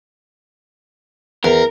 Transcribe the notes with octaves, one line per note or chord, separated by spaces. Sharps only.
E2 A#4